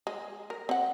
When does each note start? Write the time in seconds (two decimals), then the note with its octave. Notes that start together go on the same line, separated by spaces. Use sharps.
0.07 G#3
0.50 A#4
0.69 C4 F#5